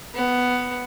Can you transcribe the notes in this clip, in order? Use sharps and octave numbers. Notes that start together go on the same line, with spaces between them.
B3